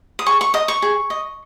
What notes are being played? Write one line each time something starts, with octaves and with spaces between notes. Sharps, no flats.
D#6
G#4 C#6
C#6
D#5 D#6
C#6
G#4
D#5